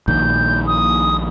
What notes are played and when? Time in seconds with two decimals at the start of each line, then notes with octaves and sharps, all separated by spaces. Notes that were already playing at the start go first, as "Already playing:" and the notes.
0.08 A#1 A#2 D#3 G6
0.67 D#6